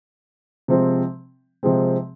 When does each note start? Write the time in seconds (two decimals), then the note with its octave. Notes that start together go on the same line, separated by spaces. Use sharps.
0.68 C3 F3 G#3 C4
1.63 C3 F3 G#3 C4